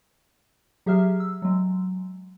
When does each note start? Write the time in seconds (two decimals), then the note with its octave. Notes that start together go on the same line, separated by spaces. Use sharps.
0.86 F#3 G4 G#4 E5 F6
1.20 E6
1.42 F#3 G#3